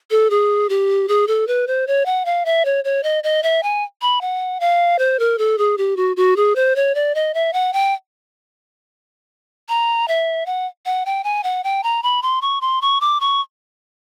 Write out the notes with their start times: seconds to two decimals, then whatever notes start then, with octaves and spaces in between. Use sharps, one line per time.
0.11 A4
0.30 G#4
0.69 G4
1.08 G#4
1.27 A4
1.47 B4
1.67 C5
1.87 C#5
2.06 F#5
2.25 F5
2.45 E5
2.65 C#5
2.84 C#5
3.03 D#5
3.24 D#5
3.43 E5
3.63 G#5
4.01 B5
4.21 F#5
4.60 F5
4.99 C5
5.19 A#4
5.38 A4
5.58 G#4
5.78 G4
5.97 F#4
6.17 F#4
6.36 G#4
6.56 C5
6.76 C#5
6.95 D5
7.15 D#5
7.34 E5
7.53 F#5
7.73 G5
9.69 A#5
10.08 E5
10.46 F#5
10.86 F#5
11.06 G5
11.24 G#5
11.44 F#5
11.64 G5
11.83 A#5
12.03 B5
12.22 C6
12.42 C#6
12.61 C6
12.82 C#6
13.01 D6
13.20 C#6